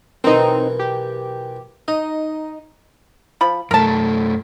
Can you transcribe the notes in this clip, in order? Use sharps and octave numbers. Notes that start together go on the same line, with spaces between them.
B1 E3 C4 D#4 A#4
G4
D#4 D#5
F3 B5
F#2 A3 A#4 A5